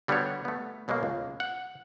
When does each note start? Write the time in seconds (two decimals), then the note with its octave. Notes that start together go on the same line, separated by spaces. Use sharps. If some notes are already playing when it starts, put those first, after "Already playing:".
0.08 D3 G3 B3 D4 F#4 C#5
0.45 A3 B3
0.88 F#2 B2 F#3 G#3 A#3
1.03 C#2
1.40 F#5